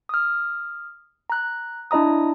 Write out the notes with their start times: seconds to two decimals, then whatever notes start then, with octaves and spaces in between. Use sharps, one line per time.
0.09 D#6 F6
1.30 A#5 F#6
1.91 D4 E4 D#5 A#5 D#6